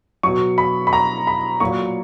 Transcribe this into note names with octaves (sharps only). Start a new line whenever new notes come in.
B2 F#3 C#6
B5
B5
A#5
B5
A#2 F#3 C#6